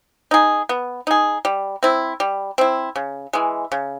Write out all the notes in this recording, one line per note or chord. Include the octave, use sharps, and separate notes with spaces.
D#4 G#4
B3
D#4 G#4
G3
C4 E4
G3
C4 E4
C#3
E3 G#3
C#3